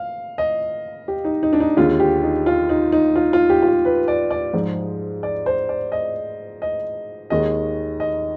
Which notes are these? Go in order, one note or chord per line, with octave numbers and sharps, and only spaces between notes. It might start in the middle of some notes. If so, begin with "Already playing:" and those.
Already playing: F5
D#5
G4
D#4
D#4
D4
D#4
D#2 D3 G#3 F4
G4
D#4
F4
D#4
D#4
F4
F4
G4
F4
G4
B4
D5
D5
G#2 F3 G#3
D5
C5
D5
D#5
D#5
D#2 D#3 G#3 D#5
D#5